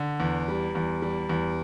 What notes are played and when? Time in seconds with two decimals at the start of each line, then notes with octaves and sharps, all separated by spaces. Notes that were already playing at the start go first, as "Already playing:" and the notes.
Already playing: D3
0.20 E2
0.48 G3
0.75 E2
1.02 G3
1.29 E2